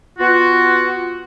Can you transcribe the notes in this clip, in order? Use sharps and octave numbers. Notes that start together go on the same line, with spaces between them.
B3 F4 F#4